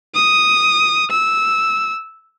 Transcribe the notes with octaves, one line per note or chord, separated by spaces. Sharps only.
D#6
E6